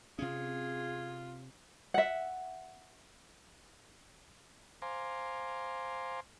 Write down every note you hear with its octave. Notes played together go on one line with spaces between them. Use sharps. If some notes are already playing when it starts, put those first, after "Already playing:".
C3 C4 C#4 F4 G#4
E5 F#5
C5 F5 G#5 A#5 C6 D6